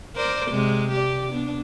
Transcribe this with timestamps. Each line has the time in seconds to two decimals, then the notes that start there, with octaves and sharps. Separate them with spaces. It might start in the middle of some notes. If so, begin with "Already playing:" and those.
0.16 A#4 C5 D5
0.50 C3 G#3
0.91 G4 D5
1.31 B3 D4